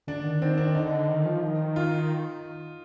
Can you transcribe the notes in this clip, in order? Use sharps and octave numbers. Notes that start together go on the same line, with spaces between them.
D3 D4
D#3
C4
D4
D3 D#4
D#3
F3
D#3
F4